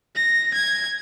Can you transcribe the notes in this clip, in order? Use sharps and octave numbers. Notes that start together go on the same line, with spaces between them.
A#6
G#6